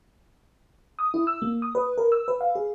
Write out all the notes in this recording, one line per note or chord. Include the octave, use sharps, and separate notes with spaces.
D#6
E4
E6
A#3
D#6
B4
A#4
E6
B4
F5
G#4